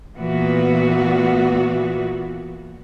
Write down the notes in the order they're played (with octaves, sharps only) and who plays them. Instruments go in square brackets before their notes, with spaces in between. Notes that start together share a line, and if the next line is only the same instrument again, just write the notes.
[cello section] A#2 E3 B3 F#4